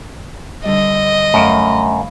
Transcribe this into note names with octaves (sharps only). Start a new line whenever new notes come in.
D3 G3 D#5
F#2 A3 F5 B5 C#6